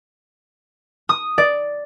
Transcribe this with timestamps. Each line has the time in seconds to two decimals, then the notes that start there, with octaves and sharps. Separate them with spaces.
1.09 D#6
1.38 D5